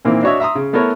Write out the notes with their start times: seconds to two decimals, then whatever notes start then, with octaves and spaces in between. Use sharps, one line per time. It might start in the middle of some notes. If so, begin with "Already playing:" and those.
0.05 A#2 D#3 E3 A#3 C4
0.23 D4 F#4 C#5 D#5 E5
0.40 E5 A#5 C6 D#6
0.55 C#3
0.73 A3 B3 E4 A4 A#4 C#5